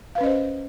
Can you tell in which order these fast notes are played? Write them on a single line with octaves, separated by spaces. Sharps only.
F5 B4 C#4 D#5 C5